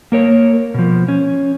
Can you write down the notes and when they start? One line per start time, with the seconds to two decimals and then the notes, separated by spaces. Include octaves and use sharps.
0.12 A#3 A#4 C#5
0.74 B2 F3
1.08 C#4